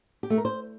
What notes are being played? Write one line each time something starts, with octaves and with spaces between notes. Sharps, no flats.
G4
A3
A#4
C5